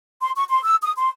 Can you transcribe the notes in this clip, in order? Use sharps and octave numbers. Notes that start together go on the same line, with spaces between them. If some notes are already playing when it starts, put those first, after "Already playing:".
C6
C#6
C6
E6
D#6
C6